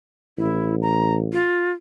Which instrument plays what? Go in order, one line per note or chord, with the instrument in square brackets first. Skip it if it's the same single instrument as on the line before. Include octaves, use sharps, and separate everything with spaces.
[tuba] A1 [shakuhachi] E4
[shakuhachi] A#5
F4